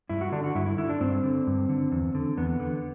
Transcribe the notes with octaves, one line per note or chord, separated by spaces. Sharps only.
G2 E4
F#4
D3 D4
F#4
G2 E4
E4
D3 E4
D4
G2 C4
D3
G2
D3
E2
D3
E2 B3
D3